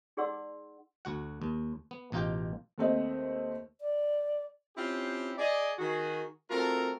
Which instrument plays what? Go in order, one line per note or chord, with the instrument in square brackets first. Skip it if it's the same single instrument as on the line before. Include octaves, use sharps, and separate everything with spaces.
[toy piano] D#4 G#4 D5 F#5 C6 E6
[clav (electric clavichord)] D2 F#4 F#5
D#2
B3
A1 B2 D#4 F4 G4 G5
[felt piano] D#2 A3 C4 D#5
[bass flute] D5
[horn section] C4 C#4 E4 F4 G4
G#4 D5 D#5
D#3 F#4 G#4
A3 C4 F4 F#4 A4 A#4